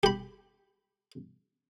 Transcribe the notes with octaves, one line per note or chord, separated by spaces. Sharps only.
G4 B5